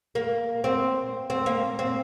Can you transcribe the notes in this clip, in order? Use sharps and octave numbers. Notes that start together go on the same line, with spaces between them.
A#3
C4
C4
A#3
C4